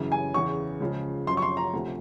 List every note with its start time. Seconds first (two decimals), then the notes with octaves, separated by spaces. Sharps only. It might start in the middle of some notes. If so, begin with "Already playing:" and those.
Already playing: F#2 C#3 E3
0.12 G#5
0.34 E2 C#3 E3 C#6
0.80 C#2 C#3 F3
1.27 F#2 C#3 F3 C6
1.37 C#6
1.42 C6
1.57 A#5
1.73 D2 C3 F3